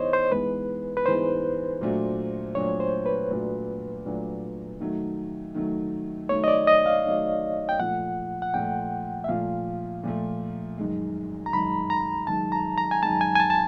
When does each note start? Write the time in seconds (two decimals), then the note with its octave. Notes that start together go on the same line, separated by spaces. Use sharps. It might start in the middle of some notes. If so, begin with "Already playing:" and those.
Already playing: G#2 E3 G#3 B3 C5 C#5 D#5
0.13 C5
0.31 G#2 E3 G#3 B3 B4
0.97 B4
1.06 G#2 E3 G#3 B3 C5
1.81 A#2 F#3 A3 D4 F#4
2.55 A#2 F#3 A3 D4 F#4 C#5
2.80 C5
3.06 B4
3.31 A#2 F#3 A3 D4 F#4
4.06 A#2 F#3 A3 D4 F#4
4.81 D#3 F#3 A3
5.55 D#3 F#3 A3
6.29 D#3 F#3 A3 C#5
6.44 D#5
6.48 D5
6.67 D#5
6.86 F5
7.04 D#3 F#3 A3
7.69 G5
7.79 A#2 F3 A3 F#5
8.42 F#5
8.54 A#2 F3 A3 G5
9.24 E5
9.28 A#2 F3 A3 F5
10.04 A#2 F3 A3
10.78 F#2 D#3 G#3
11.46 A#5
11.53 F#2 D#3 G#3 B5
11.90 A#5
12.27 F#2 D#3 G#3 A5
12.52 A#5
12.78 A#5
12.91 G#5
13.02 F#2 D#3 G#3 A5
13.21 G#5
13.36 G#5
13.40 A5
13.50 A5